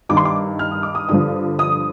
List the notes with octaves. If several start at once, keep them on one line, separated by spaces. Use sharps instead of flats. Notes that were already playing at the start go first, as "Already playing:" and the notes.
G2 D#3 D6
C6
D6
F6
D#6
D6
D#6
G2 D3 F3 D#6
D#6